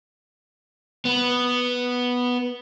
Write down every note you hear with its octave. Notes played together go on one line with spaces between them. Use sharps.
B3